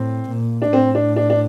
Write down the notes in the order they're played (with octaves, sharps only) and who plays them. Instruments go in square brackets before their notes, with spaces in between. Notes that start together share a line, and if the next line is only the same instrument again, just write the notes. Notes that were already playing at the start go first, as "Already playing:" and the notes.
Already playing: [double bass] A2 [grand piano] C4
[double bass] A#2
[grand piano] D4
[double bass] A2 [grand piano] C4
[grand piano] D4
D4
D4